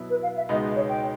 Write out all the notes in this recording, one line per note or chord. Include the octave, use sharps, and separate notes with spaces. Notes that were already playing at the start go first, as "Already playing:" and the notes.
Already playing: B2 F#3 B3 E4
B4
F5
E5
C#2 B2 G#3 B3 D#4 D#5
C#5
G5